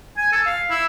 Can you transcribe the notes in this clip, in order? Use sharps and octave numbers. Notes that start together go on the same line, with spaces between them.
G#5
A4
F5
E4